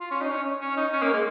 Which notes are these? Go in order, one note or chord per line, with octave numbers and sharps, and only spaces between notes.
F4
C#4
D#4
C#4
C#4
D#4
C#4
A#3
G#3